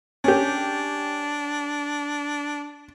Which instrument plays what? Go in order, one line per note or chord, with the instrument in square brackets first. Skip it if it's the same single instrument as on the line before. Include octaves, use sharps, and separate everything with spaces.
[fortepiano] C#4 G4 [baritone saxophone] D4